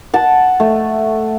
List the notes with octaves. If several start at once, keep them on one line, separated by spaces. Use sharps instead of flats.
F#5 A5
A3